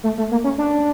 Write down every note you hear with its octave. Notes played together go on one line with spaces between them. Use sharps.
A3
A3
A#3
C#4
D4